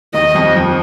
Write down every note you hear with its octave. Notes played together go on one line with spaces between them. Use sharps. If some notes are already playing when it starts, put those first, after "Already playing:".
D#2 D#3 D#5
F2 F3
F2 F3